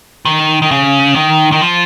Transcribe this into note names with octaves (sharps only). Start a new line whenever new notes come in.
D#3
D#3
C#3
D#3
D#3
F3